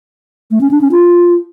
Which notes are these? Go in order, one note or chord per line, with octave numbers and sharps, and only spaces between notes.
A3
C#4
D4
C#4
F4